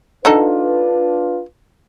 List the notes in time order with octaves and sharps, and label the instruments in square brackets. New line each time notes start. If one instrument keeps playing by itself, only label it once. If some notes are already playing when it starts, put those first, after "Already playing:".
[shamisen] D3 D#4 A4 [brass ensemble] D4 F4 B4